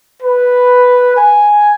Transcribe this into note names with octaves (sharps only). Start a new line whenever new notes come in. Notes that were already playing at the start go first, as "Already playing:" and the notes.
B4
G#5